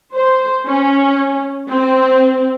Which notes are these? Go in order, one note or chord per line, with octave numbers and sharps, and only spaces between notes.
C5
C#4
C4